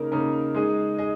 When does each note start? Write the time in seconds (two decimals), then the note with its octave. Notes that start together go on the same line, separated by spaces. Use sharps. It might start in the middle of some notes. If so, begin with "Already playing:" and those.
Already playing: C#3 A#3 D#4 A#4
0.12 C#3 A#3 D#4 A#4
0.55 G#3 D#4 G#4 D#5
0.98 G#4 D#5